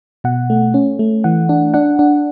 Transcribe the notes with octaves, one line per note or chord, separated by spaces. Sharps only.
B2 F#5
A3
C#4
A3
E3 F#5
D4
D4 F#5
D4